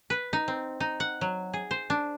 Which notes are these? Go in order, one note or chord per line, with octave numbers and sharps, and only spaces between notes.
B4
D#4
C4
D#4
F#5
F#3
G#4
C5
D4